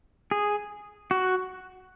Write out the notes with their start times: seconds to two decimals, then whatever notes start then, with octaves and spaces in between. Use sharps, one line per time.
0.31 G#4
1.11 F#4